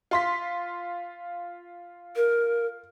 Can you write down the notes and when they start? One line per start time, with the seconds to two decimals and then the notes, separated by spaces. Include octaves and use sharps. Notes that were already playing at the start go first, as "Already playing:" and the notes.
0.11 F4 C6 B6
2.16 A#4